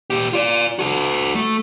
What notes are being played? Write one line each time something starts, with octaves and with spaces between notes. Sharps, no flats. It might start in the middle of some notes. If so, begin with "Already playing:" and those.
A#2 G4
F4 D5
F#4 A4
A3